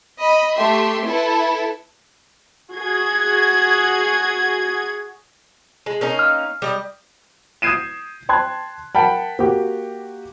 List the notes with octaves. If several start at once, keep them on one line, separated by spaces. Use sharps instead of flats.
D#5 B5
A3 G4 E5 C6
E4 A4 B4
F#4 G#4 G#6
G#3
A#3 C#4 D#4
F6
G3 D#5
D#6 G6 G#6 C7 D#7 E7
G5 A5 C6 F#6 G#6
A#4 F#5 G5 A5 B5
A#3 F#4 G4